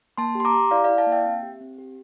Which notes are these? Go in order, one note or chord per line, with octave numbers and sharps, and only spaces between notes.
A#3 A5 C6
G4 C6
A#5 D6
G4
E4 D5 F5
D5 F5
E4
F5 A5
A#3
E5 G5
C4
G4
C4
G4